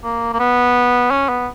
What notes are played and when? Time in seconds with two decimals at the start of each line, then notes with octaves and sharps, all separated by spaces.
0.04 A#3
0.33 A#3
0.40 B3
1.11 C#4
1.29 B3